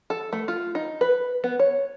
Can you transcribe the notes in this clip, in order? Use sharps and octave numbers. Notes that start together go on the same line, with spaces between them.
A4
A3
F4
D#4
B4
B3
C#5